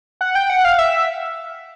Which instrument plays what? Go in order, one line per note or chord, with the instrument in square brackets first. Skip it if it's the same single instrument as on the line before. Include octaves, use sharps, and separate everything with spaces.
[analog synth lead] F#5
G5
F#5
F5
E5